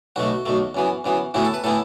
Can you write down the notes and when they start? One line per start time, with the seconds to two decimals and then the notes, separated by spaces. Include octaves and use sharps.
0.16 B1 B2 A3 F#4
0.46 B1 B2 A3
0.75 F#2 E3 B3
1.04 F#2 E3 B3
1.34 A2 E3 B3 E4 F#4
1.45 A4
1.54 B4
1.64 A2 E3 B3 E4 A4